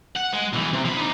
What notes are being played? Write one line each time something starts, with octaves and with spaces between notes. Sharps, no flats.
F#5
G#3
B1 E3
C3
F3 B5
D4 D#4